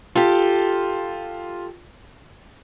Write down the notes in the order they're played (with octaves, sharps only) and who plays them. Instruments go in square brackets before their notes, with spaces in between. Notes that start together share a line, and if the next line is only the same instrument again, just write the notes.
[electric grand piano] F4 [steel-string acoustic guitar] G4 A4